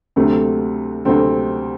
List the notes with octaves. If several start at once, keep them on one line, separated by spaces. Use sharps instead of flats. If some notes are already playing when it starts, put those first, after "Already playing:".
D2 C3 F#3 A3 C4
D2 C3 F#3 A3 C4